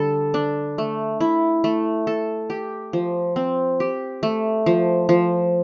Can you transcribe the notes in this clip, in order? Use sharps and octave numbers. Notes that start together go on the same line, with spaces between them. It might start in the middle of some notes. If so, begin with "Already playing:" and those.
Already playing: D3 G3 A4
D4
A3
E4
A3
A4
G4
F3
C4
G4
A3
F3
F3